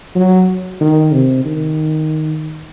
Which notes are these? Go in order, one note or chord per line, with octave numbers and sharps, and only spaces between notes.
F#3
D#3
C3
D#3